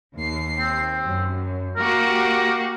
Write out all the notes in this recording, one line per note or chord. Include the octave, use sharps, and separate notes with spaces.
D#2 C7
C4
F#2
A#3 F#4 G4 A#4